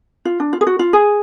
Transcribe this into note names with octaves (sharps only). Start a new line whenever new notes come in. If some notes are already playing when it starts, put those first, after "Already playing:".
F4
D4
F4
G#4
F#4
F4
G#4